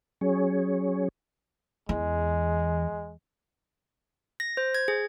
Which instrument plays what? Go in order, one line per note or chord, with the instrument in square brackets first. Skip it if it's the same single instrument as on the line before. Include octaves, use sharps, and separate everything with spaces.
[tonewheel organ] F#3 C#4 G#4 C#5
[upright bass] E2 [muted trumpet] G#3
[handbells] A#6
C5
G#6
G#4